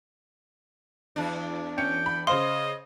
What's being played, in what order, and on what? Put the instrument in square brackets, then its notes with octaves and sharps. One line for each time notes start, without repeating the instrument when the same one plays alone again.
[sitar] E2 D4
[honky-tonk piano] C#4 C#7 [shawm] G5
[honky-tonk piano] B5
[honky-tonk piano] C#3 C5 F5 [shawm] D#5 [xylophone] C6